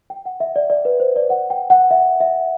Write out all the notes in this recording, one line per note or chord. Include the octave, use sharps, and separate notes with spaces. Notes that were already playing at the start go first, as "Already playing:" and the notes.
G5
F#5
E5
D5
D5
B4
C5
D5
F#5
G5
F#5
E5
E5